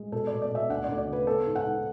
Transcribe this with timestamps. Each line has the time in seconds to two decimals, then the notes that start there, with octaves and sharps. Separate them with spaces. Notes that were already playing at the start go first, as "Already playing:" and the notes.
Already playing: G#3
0.12 B2 A4
0.27 D5
0.32 B2
0.42 D5
0.51 B2 E5
0.69 D2 F#5
0.84 D2 D5
0.98 D5
1.08 C#3 B4
1.27 B3 A4
1.46 G#2
1.56 F#5
1.65 G#2